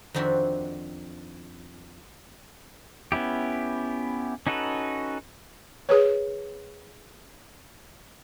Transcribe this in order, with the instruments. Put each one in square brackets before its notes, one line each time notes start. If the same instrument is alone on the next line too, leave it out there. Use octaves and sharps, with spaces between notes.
[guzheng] F2 D#3 C4 D4 F#4 E5
[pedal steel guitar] B3 C#4 E4 G4
C#4 D#4 F#4 A4 B4
[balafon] G#4 B4 C#5